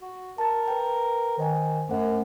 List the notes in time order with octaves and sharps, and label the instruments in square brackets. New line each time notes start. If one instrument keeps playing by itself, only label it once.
[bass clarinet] F#4
[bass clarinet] A#4 [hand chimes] A5 A6
[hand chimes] B4 G5
[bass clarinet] D#3 [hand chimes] C5 D#5 G#5
[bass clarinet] F#2 [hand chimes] A3 C5 F#5